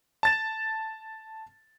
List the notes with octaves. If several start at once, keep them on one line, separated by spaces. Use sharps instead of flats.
A5 A6 E7